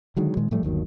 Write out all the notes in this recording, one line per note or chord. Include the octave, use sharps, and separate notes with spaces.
D3 D#3 F#3 G#3
A#2 D#3 G#3
A2 F3 G3 A3
G1 D#2 D#3 F#3